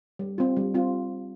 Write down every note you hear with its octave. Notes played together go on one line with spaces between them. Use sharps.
G3
C4 F4
G3
C4 F4